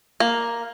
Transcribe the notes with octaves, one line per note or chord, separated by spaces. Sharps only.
A#3